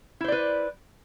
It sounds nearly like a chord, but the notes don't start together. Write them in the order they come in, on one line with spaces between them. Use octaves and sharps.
E4 C5 D5 B4